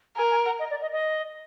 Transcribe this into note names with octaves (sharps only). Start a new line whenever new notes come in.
A#4 G#5
G#5
F#5
D#5
D5
D#5
D#5